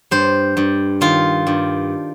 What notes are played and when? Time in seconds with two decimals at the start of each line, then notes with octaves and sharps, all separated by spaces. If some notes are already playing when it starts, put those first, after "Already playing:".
0.11 G2 C5
0.57 G2
1.01 D#3 F4
1.47 G2